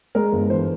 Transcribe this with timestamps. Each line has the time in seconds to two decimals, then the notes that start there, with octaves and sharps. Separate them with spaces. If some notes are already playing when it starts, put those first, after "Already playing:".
0.15 G#3 A#4
0.32 G1
0.50 E3 C5